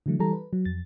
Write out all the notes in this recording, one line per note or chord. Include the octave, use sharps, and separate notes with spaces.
D3 E3 F#3 A3
E3 G3 A4 A#5
B4
F#3
F2 A6